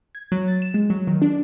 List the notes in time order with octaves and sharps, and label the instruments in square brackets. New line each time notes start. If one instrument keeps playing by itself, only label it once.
[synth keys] G#6
F#3
A6
E7
G#3
F#3
D#3
D4